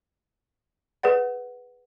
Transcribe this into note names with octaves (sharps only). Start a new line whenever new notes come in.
G#4 B4 D5 F#5